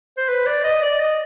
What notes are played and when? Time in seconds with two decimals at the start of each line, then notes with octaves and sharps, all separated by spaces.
0.17 C5
0.29 B4
0.46 D5
0.64 D#5
0.82 D5
1.00 D#5